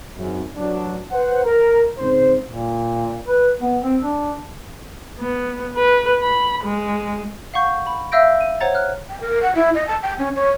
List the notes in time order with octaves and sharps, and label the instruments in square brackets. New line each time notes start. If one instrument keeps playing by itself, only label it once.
[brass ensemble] G#1 F#2
A1 F#3 D4
B4 C5 F#5
A#4
G#2 C#3 C4 C5
[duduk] A#2
B4
B3
C4
D4
[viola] B3
B4
B5
G#3
[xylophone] F5 F#5 C#6 G6
B5
E5 F5 E6 G6 A#6 D7
D#7
C5 C#5 F#5 A#5 A6
F6 F#6
[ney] G5
A#4
F#5
E4
D#5
A5
G5
C#4
C#5